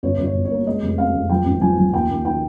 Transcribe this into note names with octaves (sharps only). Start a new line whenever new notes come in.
G1 C#5
G1
C#5
G1
C#5
A#3
G#3 D#5
F1
F2 F5
F1
F3 G5
G#1
F3 G#5
F3
D#2 G5
D#2
D#3 G5